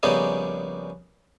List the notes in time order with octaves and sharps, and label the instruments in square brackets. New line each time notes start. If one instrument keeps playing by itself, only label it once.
[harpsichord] A#1 C#3 G3 B3 D#4 G#4